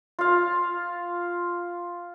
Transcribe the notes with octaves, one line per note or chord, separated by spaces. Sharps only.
F4 F5